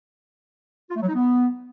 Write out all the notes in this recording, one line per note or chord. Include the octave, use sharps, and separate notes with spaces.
F4
A3
F#3
D#4
B3